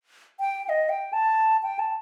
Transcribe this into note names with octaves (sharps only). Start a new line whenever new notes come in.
G5
G5
D#5
G5
A5
G5
A5